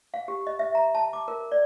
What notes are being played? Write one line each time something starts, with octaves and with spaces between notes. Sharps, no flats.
F5
G4
D#5
E5
A#5
A5
D6
A#4
D5